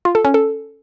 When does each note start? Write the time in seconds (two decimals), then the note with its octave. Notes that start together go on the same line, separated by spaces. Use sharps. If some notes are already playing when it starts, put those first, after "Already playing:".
0.05 F4
0.15 A4
0.25 C#4
0.34 A4